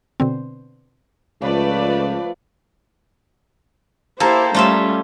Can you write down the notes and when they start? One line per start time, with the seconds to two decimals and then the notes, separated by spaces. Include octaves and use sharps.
0.20 B2 D3 C4
1.42 C#2 F3 A3 B4 D5
4.20 A#3 E4 G4 A4 C5
4.54 G3 A3 C#4 F4 E5